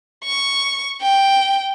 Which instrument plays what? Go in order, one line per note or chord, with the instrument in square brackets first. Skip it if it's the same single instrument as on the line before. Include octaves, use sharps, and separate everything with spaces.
[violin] C#6
G5